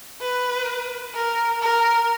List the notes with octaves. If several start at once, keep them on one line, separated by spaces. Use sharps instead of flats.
B4
A#4
A#4